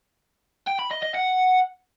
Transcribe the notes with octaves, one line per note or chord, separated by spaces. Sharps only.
G5
B5
D#5
D#5
F#5